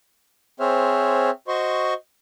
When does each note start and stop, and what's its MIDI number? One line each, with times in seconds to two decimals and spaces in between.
0.60 1.30 60
0.60 1.30 68
0.60 1.30 72
0.60 1.30 73
0.60 1.30 76
0.60 1.30 89
1.48 1.94 66
1.48 1.94 72
1.48 1.94 75
1.48 1.94 84
1.48 1.94 85